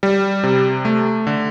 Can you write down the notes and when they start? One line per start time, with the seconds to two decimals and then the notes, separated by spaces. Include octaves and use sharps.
0.03 G3
0.44 C3
0.85 A3
1.27 D3